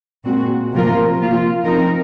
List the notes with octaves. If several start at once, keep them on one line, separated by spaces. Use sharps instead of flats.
A#2 G#3 C4 F#4
C3 F3 A#3 F4 A#4
F3 A#3 F4
F3 C4 D#4 A#4